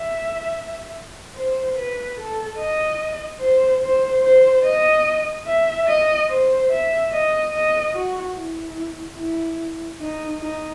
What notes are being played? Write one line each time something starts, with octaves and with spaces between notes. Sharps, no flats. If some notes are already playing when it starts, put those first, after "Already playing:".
Already playing: E5
C5
B4
A4
D#5
C5
C5
C5
D#5
E5
D#5
C5
E5
D#5
D#5
F#4
E4
E4
D#4
D#4